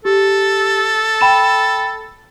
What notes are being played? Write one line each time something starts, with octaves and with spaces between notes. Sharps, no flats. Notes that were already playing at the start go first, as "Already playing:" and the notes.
G4 A4
G5 B5 E7